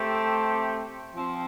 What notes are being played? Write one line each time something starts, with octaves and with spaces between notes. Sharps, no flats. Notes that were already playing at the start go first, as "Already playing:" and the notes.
Already playing: A3 C4 G4
F3 C4